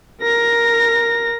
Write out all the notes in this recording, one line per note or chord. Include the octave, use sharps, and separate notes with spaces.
A#4 A#6